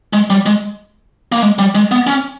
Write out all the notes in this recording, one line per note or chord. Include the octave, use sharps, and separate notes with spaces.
G#3
G3
G#3
A#3
G#3
G3
G#3
B3
C#4